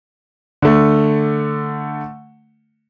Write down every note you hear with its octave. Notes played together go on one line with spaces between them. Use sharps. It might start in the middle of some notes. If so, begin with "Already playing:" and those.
D3 A3